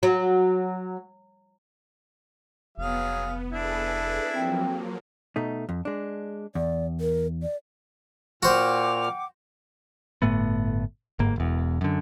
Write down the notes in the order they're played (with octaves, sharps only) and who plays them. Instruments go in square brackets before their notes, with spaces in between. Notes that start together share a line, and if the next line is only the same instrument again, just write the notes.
[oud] F#3
[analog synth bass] F1 [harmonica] F#3 G#4 F5 [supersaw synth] B3
[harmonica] D4 E4 [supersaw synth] G#4 A4 B4
[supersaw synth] F3 F#3 A#3 [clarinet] C4
[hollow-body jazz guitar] B2 A3 D#4
F2
G#3 D4
[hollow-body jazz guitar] E2 [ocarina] D5
[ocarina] A#4
D5
[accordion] A#2 F6 [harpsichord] F#4 C5 [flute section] F#5 G5 D6
[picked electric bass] G1 A2 A3 B3
G1 G#2 A#3
E1 E2
F#2 D3